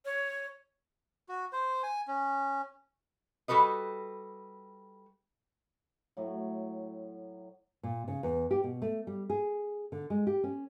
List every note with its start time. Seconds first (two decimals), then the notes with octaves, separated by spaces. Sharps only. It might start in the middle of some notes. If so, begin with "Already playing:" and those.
0.05 C#5
1.29 F#4
1.53 C5
1.83 G#5
2.08 C#4
3.48 G3 F#4 A4 B4 D#5
6.17 A2 F#3
7.83 A#2
8.08 C#3
8.23 E2
8.51 G4
8.64 B2
8.82 A3
9.07 G3
9.30 G#4
9.92 D3
10.10 G#3
10.27 G4
10.44 C#4